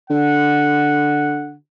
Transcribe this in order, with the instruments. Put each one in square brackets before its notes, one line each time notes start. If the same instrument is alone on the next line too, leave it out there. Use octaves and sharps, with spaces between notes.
[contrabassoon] D3 [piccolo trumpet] F#5